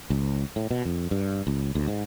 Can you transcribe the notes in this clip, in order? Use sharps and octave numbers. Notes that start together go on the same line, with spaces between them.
C#2
A2
B2
F2
G2
C#2
D2
G#2